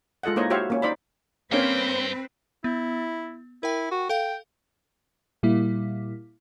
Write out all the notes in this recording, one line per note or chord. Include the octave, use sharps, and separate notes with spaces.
G#3 F4 A4 D#5 F#5
A#3 D#4 E4 C5 C#5 D#5
F#4 G4 C5 C#5 E5 F5
A#3 C#4
D#4 C5 D5 B5
G2 A#3 C4 C#4 B4 G5
B3 E4
E4 A#4 G5
F#4
A4 F5 G5
A#2 G3 A#3 E4